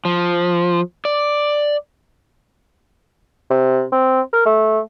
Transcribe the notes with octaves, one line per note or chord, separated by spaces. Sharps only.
F3
D5
C3
C4
A#4
A3